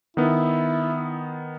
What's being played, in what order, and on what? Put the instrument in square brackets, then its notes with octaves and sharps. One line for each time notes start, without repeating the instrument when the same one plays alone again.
[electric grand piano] D#3 B3 [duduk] E4